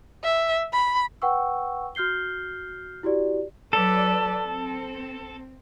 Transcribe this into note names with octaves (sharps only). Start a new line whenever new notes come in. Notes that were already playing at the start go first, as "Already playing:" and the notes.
E5
B5
B4 F#5 G5 C#6 E6
F#4 F6 G6 C7 G7
E4 F#4 G4 D5
F#3 A4 B4 D5
C4